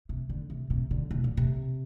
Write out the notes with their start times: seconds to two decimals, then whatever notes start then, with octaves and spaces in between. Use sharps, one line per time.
0.09 C3
0.29 D3
0.50 C3
0.70 C3
0.91 D3
1.11 C3
1.24 A#2
1.37 C3